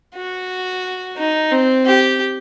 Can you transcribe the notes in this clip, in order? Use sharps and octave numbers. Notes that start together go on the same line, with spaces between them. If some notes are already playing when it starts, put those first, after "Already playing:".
F#4
D#4
C4
G4